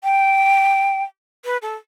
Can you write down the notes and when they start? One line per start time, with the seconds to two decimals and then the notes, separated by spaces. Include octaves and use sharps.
0.04 G5
1.45 B4
1.62 A4